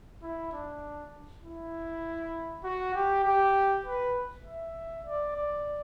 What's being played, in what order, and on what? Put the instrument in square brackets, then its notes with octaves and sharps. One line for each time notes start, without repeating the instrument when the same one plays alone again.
[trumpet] E4
D4
E4
F#4
G4
G4
B4
E5
D5
D5